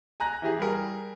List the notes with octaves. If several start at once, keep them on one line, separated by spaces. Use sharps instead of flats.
G#5 A#5 F#6 A#6
E3 E4 G4 G#4
G3 G#4 A#4